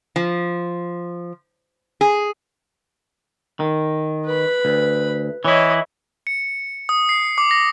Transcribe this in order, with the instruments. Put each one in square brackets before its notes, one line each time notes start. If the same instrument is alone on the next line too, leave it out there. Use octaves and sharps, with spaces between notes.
[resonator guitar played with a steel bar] F3
G#4
[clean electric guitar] D#3
[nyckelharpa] B4 B5
[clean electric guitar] D2
[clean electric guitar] E3 E4 [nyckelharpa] C#5 D#5
[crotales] C#7
D#6
C7
D6
A#6